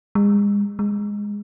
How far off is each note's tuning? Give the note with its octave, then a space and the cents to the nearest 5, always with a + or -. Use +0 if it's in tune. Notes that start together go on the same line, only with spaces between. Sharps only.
G#3 -35
G#3 -10